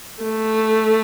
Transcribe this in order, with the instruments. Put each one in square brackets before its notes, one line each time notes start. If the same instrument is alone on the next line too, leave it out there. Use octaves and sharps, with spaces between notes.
[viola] A3